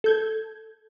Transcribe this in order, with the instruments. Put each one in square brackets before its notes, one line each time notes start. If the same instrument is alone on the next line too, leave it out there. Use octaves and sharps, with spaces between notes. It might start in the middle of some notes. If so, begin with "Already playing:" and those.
[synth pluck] A4 G6 G#6